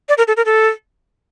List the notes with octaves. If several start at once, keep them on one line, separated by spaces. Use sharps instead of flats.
D5
A#4
A4
A#4
A4